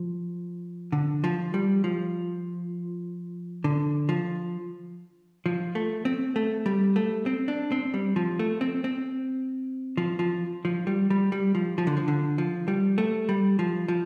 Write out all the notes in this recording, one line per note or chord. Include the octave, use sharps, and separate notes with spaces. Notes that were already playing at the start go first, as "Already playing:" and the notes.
Already playing: F3
D3
F3
G3
F3
D3
F3
F3
A3
C4
A3
G3
A3
C4
D4
C4
G3
F3
A3
C4
C4
F3
F3
F3
G3
G3
G3
F3
F3
D3
F3
D3
F3
G3
A3
G3
F3
F3